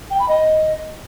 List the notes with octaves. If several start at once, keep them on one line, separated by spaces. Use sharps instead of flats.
G5
B5
D#5